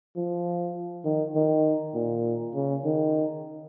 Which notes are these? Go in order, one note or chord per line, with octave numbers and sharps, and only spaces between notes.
F3
D#3
D#3
A#2
C#3
D#3